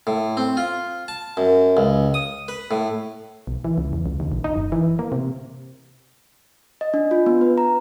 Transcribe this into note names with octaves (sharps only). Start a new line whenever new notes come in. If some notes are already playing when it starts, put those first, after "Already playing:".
A2
C4
F4
A5
F#2
C#2
D#6
B4
A2
B1
E3
C#2
E2
C#2
D#2
A#1
D#4
F#1
E3
A#3
C3
D#5
D4
F4
B3
B4
A#5